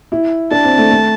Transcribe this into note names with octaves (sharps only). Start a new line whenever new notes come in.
E4
D4 A5
C4
A3
A3